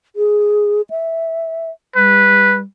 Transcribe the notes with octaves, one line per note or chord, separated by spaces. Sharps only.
G#4
E5
G3 B4